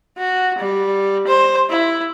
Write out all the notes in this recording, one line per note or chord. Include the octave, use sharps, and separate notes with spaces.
F#4
G3
C5
E4